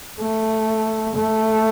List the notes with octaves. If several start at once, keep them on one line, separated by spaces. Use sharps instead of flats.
A3
A3